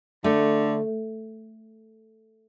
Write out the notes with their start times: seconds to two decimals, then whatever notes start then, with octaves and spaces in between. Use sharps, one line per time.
0.24 D3 A3